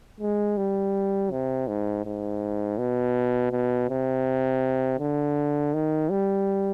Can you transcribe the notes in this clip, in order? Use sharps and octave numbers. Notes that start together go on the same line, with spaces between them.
G#3
G3
C3
G#2
G#2
B2
B2
C3
D3
D#3
G3